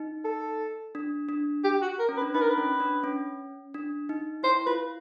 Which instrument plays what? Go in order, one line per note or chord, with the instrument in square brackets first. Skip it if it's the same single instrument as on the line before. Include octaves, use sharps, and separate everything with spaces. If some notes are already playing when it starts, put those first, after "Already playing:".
Already playing: [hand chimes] D#4
[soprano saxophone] A4
[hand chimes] D4
D4
[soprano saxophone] G4
F#4
A#4
[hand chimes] C#4
[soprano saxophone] B4
[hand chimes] D4
[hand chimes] D#4 [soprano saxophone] B4
[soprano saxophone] A#4
B4
[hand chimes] C#4
D4
C#4
D4
D#4
[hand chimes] E4 [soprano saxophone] C5
[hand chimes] F4 [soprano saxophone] B4